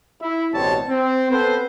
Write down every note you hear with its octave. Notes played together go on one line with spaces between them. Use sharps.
E4
A1 B2 G3 C4 C#5 A5
C4
B3 C4 A4 B4 C5